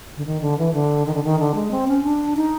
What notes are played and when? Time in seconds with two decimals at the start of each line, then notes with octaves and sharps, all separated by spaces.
0.17 D3
0.26 D#3
0.41 D3
0.58 E3
0.74 D3
1.06 D#3
1.15 D3
1.24 D#3
1.39 D3
1.55 G#3
1.71 C4
1.88 C#4
2.04 D4
2.37 D#4